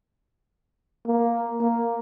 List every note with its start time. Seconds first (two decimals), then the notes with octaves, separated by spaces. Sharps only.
1.07 A#3
1.61 A#3